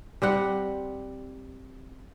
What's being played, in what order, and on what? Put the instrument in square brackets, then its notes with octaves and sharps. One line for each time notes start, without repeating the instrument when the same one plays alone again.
[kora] G3 C4 F#5